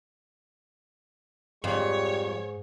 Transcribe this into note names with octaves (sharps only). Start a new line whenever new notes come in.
F2 G#2 G3 C#5